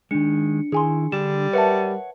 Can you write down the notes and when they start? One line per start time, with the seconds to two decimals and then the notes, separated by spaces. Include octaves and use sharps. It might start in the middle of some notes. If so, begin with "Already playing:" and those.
0.11 D#3 G#3 D4 C#7
0.72 D#3 E4 G#4 G#5 C6
1.12 D3 G3 E7
1.53 A#4 B4 C#5 E5 F#5 A5